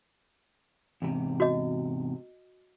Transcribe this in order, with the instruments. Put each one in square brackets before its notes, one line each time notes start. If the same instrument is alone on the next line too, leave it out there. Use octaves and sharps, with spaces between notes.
[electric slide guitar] E2 G#2 C3
[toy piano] F#4 D#5